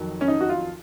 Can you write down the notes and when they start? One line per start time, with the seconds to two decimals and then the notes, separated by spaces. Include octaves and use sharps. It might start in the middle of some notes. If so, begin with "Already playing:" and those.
Already playing: F2 D#3 F#3
0.21 C#4
0.28 D#4
0.41 F#4
0.49 F4